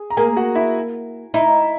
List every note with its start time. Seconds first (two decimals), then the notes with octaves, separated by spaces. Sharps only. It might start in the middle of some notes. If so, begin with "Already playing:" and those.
Already playing: G#4
0.10 A#5
0.17 A#3 G#4 G#5
0.36 F#4 F#5
0.55 E4 E5
1.34 D#4 E4 E5